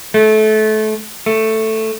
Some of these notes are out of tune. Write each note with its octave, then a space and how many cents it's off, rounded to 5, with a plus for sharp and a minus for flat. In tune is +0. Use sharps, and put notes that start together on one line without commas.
A3 -25
A3 +5